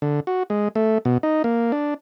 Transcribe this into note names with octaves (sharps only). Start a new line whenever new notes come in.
D3
F#4
G#3
A3
B2
D#4
A#3
D4